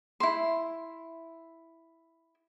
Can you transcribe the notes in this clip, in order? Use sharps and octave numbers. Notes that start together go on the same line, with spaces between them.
E4 C6